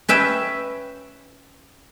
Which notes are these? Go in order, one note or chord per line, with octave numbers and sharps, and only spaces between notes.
C#4 B4 E5 G5